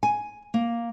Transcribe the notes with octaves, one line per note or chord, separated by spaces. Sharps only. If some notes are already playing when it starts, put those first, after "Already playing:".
G#5
A#3